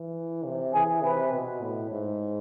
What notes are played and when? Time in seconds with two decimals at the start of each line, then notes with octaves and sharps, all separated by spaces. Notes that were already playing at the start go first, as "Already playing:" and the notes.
Already playing: E3
0.45 C3
0.74 E3 G#4
1.03 C3 B4
1.33 B2
1.62 A2
1.91 G#2